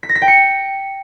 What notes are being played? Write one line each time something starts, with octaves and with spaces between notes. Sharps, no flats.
B6
A#6
B6
G5
C#7